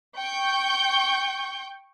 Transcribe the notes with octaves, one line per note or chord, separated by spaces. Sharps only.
G5 C#6 G6